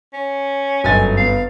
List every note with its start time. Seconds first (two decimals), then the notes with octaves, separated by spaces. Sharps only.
0.13 C#4
0.84 G1 F#2 A4 D#5 G#5 A6
1.17 B3 F5